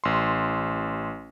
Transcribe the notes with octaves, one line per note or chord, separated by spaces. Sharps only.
A1 C6